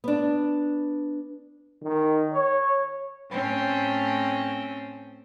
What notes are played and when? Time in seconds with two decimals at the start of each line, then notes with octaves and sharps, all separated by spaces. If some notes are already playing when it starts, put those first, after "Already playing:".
0.04 B3 D4
1.83 D#3
2.33 C#5
3.29 A2 C4 C#4